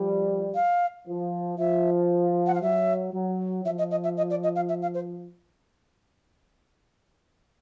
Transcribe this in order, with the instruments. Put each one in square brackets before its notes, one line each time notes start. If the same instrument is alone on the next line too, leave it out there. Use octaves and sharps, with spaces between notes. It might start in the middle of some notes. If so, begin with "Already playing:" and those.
Already playing: [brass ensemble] F3 G3
[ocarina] F5
[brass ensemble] F3
[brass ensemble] F3 [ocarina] E5
[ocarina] F#5
F5
[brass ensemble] F#3 [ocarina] E5
[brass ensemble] F#3
[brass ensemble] F3 [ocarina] E5
[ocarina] D#5
D#5
E5
D#5
D5
D#5
F5
E5
F5
C5